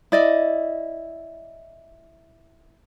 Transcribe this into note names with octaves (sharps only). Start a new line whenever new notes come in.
E4 D5 D#5